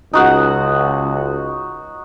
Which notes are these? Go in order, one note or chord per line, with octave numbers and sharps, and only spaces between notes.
C#2 D#4 F#4 F#5